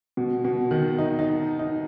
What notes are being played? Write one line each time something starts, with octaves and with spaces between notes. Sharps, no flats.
B2
B2
D#3
D#4
D#4
D#4